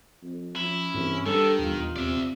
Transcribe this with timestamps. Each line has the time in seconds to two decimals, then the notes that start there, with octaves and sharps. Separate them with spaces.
0.22 F2
0.56 F3 C#4 E4
0.94 C2 G2 E3
1.26 G2 D#3 G3 A4
1.59 D#1 E2 F4
1.96 C3 D5 E5